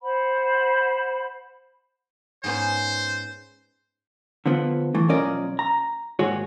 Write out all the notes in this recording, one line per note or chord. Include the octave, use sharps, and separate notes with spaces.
C5 F#5 B5
G#2 B3 C#4 C5
D3 F3 B3
E3 A3
B1 F3 C#4 A#4 D5 D#5
A#5
D#2 G#2 F#4 G#4 C#5